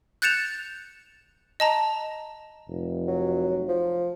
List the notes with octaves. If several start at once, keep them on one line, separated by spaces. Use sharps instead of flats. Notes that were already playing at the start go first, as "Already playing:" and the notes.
F#6 G6 A6 C#7 E7 F7
D#5 A5 A#5
F1
F#3
F3